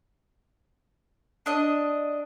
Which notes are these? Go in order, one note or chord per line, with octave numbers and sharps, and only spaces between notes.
D4 D#5